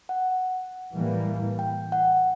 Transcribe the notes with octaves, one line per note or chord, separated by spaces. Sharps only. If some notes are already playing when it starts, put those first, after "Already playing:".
F#5
A2 E3 G3 A#3
G5
F#5